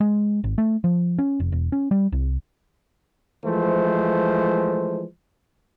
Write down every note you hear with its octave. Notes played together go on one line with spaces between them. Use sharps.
G#3
G#1
A3
F3
C#4
F1
E1
C#4
G3
C2
E3 F3 G#3 A3 C5